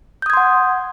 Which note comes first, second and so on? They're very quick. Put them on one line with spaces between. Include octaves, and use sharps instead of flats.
G6 D#6 G#6 C6 F#5